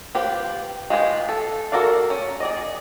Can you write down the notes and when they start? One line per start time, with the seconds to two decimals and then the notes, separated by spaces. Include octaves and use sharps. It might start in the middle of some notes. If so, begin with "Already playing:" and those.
0.15 F4 G4 B4 C5
0.90 G#3 F4 G4 G#4 B4
1.29 A4
1.72 F#4 A4 A#4 D5 F5
2.10 C#4
2.40 G#4 D5 D#5